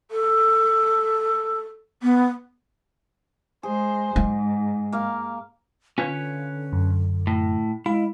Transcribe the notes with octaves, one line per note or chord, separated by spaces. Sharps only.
A4
B3
G#3 G#4 C5
G#2 G#3
A#3 F5
D3 C#4 F4 B4 C#5
F#2
A2
G#3 E4 F5